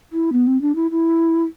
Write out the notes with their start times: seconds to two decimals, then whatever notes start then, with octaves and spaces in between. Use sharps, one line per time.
0.12 E4
0.32 B3
0.46 C4
0.61 D4
0.75 E4
0.90 E4